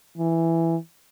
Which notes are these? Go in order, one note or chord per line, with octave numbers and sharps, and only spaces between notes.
E3